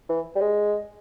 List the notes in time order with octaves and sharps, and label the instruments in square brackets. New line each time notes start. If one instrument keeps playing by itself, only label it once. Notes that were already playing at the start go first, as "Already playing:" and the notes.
[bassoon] E3
G3
G#3